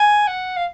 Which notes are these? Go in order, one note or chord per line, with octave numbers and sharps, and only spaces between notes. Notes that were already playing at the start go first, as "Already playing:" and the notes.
Already playing: G#5
F#5
F5